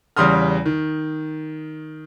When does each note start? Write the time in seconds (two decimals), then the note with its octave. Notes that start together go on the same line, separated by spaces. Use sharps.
0.17 E2 C#3 G3 C6 D#6 F6
0.66 D#3